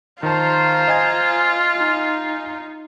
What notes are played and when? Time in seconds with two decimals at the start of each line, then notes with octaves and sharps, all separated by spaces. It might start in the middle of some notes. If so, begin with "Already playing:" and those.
0.23 D#3 F4 C5 A5 A#5
0.88 D#5 G#5 G#6
1.77 D#4